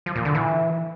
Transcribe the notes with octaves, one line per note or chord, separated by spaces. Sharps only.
F3
A#2
D3
E3